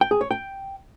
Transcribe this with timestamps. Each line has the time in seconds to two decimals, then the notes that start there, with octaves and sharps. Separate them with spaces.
0.01 G5
0.11 G#4
0.21 C#5
0.31 G5